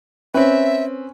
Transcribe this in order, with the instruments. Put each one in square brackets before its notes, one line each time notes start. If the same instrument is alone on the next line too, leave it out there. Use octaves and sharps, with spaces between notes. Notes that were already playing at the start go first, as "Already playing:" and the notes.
[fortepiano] C4 B4 [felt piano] C#4 [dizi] E5